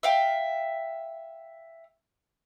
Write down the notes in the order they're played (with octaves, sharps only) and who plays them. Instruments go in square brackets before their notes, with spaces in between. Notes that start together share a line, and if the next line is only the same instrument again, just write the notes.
[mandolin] E5 F5 G5